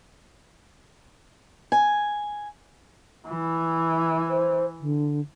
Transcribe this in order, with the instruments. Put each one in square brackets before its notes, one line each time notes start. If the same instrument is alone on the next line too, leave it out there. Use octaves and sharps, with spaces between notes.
[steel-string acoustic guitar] G#5
[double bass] E3
[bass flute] C5
D3